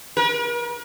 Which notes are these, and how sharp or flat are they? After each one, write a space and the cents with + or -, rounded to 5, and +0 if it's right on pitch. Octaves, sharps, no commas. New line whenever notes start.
A#4 +45